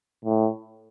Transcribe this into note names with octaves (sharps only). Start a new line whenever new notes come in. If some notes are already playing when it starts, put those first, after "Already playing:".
A2